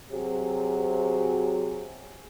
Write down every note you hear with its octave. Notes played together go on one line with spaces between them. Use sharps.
C3 F#3 F#4 G#4